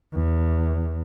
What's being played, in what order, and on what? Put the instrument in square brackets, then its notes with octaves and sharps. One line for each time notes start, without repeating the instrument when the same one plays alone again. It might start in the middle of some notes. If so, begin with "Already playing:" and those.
[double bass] E2